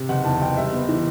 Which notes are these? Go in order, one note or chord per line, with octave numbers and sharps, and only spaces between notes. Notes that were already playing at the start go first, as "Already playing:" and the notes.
Already playing: C3
F#1 F#5
E2 A5
F#1 G5
G3 E5
B3
E3